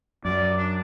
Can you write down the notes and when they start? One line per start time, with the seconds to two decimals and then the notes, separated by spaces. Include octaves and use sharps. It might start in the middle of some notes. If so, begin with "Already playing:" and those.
0.25 F#2 D5
0.58 D4